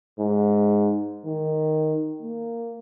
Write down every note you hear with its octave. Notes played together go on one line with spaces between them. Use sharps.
G#2
D#3
A#3